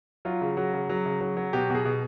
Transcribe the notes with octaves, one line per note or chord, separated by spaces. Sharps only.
F#3 F4
C#3
F#3 F#4
C#3
F#3
C#3
F#3
F#3
B2 G4
B2 G#4
B2